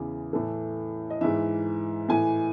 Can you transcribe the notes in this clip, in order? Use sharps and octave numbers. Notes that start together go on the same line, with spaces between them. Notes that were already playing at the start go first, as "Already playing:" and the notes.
Already playing: E2 C#3 E3 G#4
A2 E3 A4
D#5
G#2 E3 E5
A2 E3 G#5